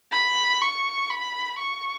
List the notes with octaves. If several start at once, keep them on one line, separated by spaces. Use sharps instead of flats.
B5
C#6
B5
C#6